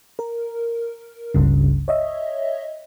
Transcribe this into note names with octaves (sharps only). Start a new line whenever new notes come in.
A#4
G1 C#2 G2 C#3
C#5 D#5 E5